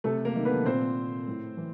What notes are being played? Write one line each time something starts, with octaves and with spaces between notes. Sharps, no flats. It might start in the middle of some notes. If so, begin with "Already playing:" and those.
C3 A3 A4
A#3 A#4
D#3
B3 B4
A#2 C4 C5
A2
E3